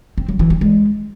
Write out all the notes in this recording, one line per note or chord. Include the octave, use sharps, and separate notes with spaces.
C4
F#3
E3
G3
G#3